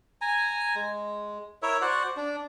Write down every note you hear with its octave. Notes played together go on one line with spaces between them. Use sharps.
G#5 A#5
G#3
E4 A#4 C#5 E5
F#4 C5 D5 F#5
D4